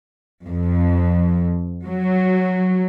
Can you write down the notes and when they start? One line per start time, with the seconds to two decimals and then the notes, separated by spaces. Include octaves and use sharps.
0.48 F2
1.86 F#3